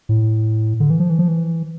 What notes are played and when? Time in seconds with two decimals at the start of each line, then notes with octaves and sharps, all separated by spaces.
0.09 A2
0.80 D3
0.90 E3
1.00 F3
1.10 E3
1.19 F3
1.28 E3